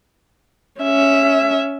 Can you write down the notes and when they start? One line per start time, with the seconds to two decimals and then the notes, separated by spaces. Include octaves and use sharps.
0.82 C#4 E5